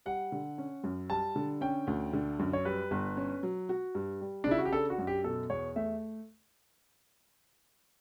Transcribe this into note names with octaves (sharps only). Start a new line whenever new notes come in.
G3 F#5
D3
C#4
F#2
G3 A5
D3
C#4 G5
D2
D3
F#2
C#5
G3 B4
G1
C#4
F#3
F#4
G2
G3
D4
C#3 E4
F#4
G4
D4 A4
F#4
F#2
G4
B2 A4
E2 C#5
A3 E5